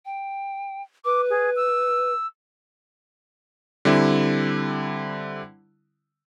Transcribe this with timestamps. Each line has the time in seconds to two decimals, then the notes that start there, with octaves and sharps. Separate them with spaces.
0.05 G5
1.05 B4 D6
1.30 G#4
1.56 E6
3.85 D3 G3 C4 E4